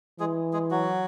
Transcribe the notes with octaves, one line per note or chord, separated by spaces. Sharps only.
E3 G#3 G#4
G#3 G#4
F#3 F#4